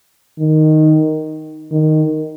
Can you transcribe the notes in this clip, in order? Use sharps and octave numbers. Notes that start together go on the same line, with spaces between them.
D#3
D#3